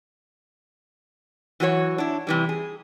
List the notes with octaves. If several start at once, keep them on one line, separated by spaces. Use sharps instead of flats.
E3 F#3 F#4 A#4 C#5
D4 E4
C3 E3 G3
G#4